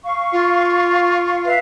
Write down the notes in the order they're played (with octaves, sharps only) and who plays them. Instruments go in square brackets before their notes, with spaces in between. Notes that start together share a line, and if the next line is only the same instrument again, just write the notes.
[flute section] F5 C#6
[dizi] F4
[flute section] B4 E5 F5